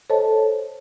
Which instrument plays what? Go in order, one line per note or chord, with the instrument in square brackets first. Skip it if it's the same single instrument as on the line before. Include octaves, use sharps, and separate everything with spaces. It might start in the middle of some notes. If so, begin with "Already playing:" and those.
[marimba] A4 C5 C#5 D#5 A5